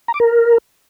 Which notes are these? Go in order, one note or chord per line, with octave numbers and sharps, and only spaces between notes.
A#5
D6
A#4